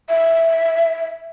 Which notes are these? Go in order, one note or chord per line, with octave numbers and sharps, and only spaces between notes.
E5